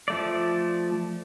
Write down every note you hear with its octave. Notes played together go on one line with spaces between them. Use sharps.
F3 A3 D5